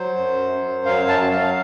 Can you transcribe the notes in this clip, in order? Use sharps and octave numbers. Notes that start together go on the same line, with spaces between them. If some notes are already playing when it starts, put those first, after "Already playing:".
Already playing: F#3 C5
F#2
F#2
F#3 F5
A5
F#3
F5